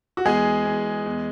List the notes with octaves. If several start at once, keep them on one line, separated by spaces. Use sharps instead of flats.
F#4
E2 G#3 G#4
E2
E2